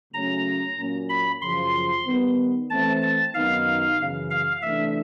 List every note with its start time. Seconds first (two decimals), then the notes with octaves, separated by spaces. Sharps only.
0.13 C#3 F#3 A3 C#4 A#5
0.78 A#2 F#3 A#3 C#4
1.09 B5
1.42 F#2 C#3 F3 C6
2.05 D#3 G3 B3
2.69 E3 A3 C4 A5
3.02 A5
3.34 F#2 D#3 F#3 B3 D#4 F5
3.98 F#2 C#3 E3
4.30 F5
4.62 C3 E3 A3 D4 E5